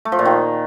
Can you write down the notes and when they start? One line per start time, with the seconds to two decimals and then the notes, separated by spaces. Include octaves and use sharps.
0.05 A3
0.12 F3
0.19 A#2
0.25 D#3